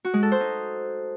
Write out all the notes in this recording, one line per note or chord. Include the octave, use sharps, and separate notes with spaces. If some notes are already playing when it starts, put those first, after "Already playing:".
F#4
G#3
A4
C5
D#4